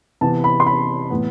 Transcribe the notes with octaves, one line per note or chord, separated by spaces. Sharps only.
C3 E3 B3 A5
B5
C6
B5
A2 E3 B3